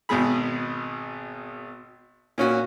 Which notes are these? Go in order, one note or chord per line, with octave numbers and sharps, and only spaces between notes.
G#1 B2 G#3 G#4 B5
A#2 C#4 F#4